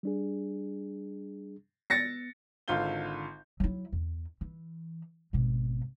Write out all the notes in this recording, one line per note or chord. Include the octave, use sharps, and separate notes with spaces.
G3 D4 G#4
B3 A6 A#6 C#7
G#1 D3 F4 F5 G6 G7
F#3 E4
E2
E3
G#1 B2